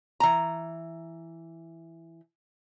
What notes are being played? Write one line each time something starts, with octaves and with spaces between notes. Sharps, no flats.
E3 A#5